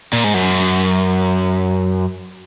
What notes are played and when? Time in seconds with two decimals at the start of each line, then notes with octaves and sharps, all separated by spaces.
0.13 A#2
0.24 G#2
0.34 F#2